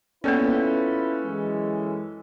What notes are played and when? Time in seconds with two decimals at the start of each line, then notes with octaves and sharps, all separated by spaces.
0.24 A#3 B3 C#4 E4 F4 A4 B4 D5
1.23 F#2 E3 G#3